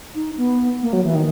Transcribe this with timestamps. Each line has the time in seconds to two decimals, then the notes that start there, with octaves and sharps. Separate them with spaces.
0.15 D#4
0.37 B3
0.82 A#3
0.93 F#3
1.04 E3
1.15 D#3